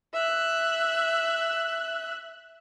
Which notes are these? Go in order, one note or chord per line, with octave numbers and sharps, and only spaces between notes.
E5 F#6